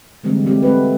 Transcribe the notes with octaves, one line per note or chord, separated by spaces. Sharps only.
D3 E3 G3 G#3 A#3 C4
F#3 G#3 A3 C4 G4
A3 C4 F#4 B4